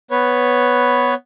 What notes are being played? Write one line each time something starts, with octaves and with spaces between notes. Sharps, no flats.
B3 B4 C#5